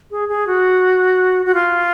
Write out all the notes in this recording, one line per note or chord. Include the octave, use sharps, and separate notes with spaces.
G#4
G#4
F#4
F#4
F4